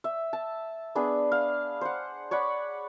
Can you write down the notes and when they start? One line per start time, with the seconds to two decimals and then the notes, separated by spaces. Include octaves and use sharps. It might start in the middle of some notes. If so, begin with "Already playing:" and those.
0.04 E5
0.33 A5
0.95 B3 D4 G#4 B4
1.32 F5
1.81 C5 F#5
2.31 C#5 D5 F#5 B5